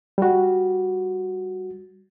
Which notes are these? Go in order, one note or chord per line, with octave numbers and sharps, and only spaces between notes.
G3 F#4